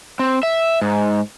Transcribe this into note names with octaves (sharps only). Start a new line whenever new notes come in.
C4
E5
G#2